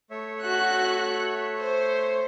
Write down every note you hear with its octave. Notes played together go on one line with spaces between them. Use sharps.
A3 C#5 E5
F#4 F#6
C5